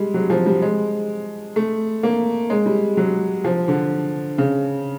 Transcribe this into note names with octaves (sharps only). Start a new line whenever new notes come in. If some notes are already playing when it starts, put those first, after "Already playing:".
Already playing: G3 G#3
F#3
F3
G3
G#3
A3
A#3
G#3
G3
F#3
F3
D3
C#3